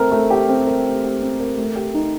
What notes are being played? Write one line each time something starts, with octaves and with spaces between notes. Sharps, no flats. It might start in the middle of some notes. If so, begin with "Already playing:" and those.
Already playing: A3 C4 A#4
A3
G4
C4
A#4
A3
G4
C4
A#4
A3
G4
D#4